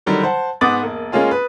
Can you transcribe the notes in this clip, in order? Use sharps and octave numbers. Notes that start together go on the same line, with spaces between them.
D3 D#3 F#3 G3
C5 F#5 A5
G#2 B3 D6 D#6 A6 F#7
E1 A#3
G#3 A#3 C#4 F4 G#4
B4